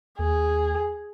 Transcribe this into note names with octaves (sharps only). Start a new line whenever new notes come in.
D#2 G#4